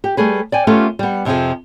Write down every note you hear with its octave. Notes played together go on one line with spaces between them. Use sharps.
G4
G3 A3 G#4 B4
D5 G5 G#5
A3 B3 C#4 F4 G4 A4
G3 B3
F2 C3 E3 F3 G#4